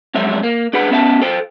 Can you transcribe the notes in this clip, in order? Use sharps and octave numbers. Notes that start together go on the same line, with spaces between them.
F2 F#3 G#3 C#5 E5
A#3
D4 G#4 B4 F#5 B5
B3 C#4 E5 A5
A4 C5 G5